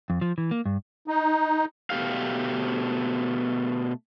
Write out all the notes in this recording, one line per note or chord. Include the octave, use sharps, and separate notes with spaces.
F2
F3
E3
A#3
G2
D#4
B2 A3 G4 F5